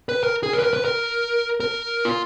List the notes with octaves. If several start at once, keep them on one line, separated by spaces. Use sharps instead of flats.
B4
A#4
G#4
A#4
B4
A#4
B4
A#4
A#4
F4